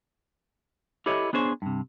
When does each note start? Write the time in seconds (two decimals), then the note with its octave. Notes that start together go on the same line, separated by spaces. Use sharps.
1.06 E4 G4 A4 C#5 D#5
1.33 B3 D4 G#4 C5 C#5
1.62 G2 C3